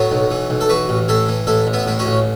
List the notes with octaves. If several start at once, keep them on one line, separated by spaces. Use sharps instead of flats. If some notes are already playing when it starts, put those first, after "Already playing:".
Already playing: A2 F#3 B3
B1
E3
B1
A4
E3 F#4 B4
A1
A2 E4 A4
E3
A1 E4 A4
A1
B3 E4
A2 E4
C#4 F#4
A1